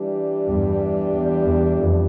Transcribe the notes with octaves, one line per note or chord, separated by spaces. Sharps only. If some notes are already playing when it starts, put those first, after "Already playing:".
Already playing: E3 G3 D4 G4
E2 G2
E2
E2
F2